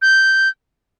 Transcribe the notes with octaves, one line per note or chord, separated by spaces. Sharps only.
G6